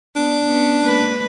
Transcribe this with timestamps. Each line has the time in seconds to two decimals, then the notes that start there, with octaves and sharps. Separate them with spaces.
0.16 B3 D4
0.46 B3 C#4
0.84 G#3 A#3 B4